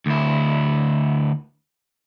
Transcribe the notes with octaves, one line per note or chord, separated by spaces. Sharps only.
D2 E4